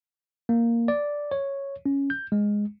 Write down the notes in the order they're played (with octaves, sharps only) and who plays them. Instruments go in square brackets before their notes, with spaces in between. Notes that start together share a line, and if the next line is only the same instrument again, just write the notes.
[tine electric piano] A#3
D5
C#5
C#4
G6
G#3